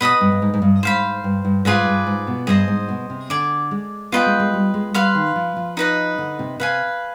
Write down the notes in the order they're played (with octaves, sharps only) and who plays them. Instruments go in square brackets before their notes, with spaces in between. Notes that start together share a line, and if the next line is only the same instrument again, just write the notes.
[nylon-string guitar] B2 [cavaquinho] B4 D#5 B5 D#6
[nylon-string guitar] G2
G2
G#2
G#2
G2
[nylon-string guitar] G#2 [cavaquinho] C5 F5 B5
[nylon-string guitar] G2
G2
[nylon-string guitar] G#2 [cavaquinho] F4 G#4 B4 D5
[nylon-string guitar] G2
G#2
B2
[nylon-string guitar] G2 [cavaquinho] G#4 C5 D#5
[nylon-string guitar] G#2
B2
C3
[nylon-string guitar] D3 [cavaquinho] D5 G#5 D6
[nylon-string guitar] G#3
[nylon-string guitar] B3 [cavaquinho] F4 B4 D#5 G5
[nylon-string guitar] G#3
G#3
G3
G#3
[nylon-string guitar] G3 [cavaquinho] B4 F5 C6
[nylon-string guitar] D#3
F3
F3
[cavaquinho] D#4 B4 D#5
[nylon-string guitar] D3
C3
[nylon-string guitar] C3 [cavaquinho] B4 F5 G#5